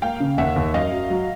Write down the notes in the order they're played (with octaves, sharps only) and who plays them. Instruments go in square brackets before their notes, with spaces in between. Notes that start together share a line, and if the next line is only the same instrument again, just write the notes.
[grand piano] A#3 [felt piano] F5 G5
[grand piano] C#3
[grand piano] D#2 [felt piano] E5 F#5
[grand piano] D#2
[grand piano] F#2 [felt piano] D#5 F5
[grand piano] F#3
F#3